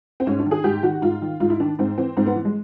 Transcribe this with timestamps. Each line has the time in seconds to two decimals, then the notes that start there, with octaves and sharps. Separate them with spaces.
0.20 C4
0.27 G#2 C#4
0.39 D4
0.46 D#3
0.51 G#4
0.64 G#2 G4
0.83 D#3 F#4
1.02 G#2 F4
1.22 D#3
1.40 G#2 F4
1.50 E4
1.60 D#3 D4
1.79 G#2 C4
1.98 E3 C4
2.17 G#2 C4
2.26 B3
2.36 E3
2.45 G#3